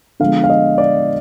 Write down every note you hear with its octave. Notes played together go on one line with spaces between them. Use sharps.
D3 F3 G#3 B3 F5
F5
D#5
D5